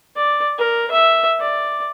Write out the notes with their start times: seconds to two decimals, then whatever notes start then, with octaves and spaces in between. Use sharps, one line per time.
0.16 D5
0.58 A#4
0.91 E5
1.40 D5